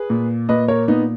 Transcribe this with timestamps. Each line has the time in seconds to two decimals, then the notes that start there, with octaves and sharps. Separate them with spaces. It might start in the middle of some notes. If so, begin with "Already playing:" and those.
Already playing: G#4 B4
0.10 A#2
0.49 A#2 B4 D#5
0.68 A#4 C#5
0.88 A#2 B3 D#4